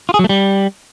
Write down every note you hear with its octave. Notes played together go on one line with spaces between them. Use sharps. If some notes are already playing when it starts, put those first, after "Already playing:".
F4
G#4
F#3
A3
G3